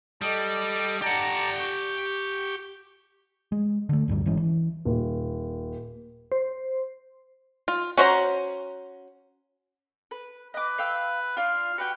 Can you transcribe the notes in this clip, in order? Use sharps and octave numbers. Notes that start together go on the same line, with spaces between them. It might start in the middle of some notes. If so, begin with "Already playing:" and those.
G3 A4 D#5 D6
G4 D5 F#5 A5 A#5
C#6 G6
G#3
D3 A3
D1 D2 G2 G3
G#1 E3 G#3 C#4
E3
D#1
C5
F4
C#4 F#4 C5 D#5 A#5
B4
B4 D#5 D6
F5 G5 E6
D4 F4 F5
F#4 G4 B4 G5